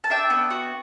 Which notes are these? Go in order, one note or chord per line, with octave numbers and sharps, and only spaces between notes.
A5
D4 E5 G5
B3
F#4